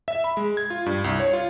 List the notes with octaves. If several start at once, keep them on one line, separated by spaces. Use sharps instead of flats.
E5
B5
G#3
G#6
F4
G2
C2
C#5
F4